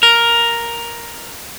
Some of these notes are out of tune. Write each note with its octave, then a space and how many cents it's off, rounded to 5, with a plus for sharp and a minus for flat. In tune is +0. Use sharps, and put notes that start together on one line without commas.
A#4 +5